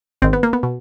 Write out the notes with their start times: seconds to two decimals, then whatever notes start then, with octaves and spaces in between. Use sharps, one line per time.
0.22 G#1 G#2 D#3 C4
0.33 B3
0.43 A#3
0.53 B3
0.63 B2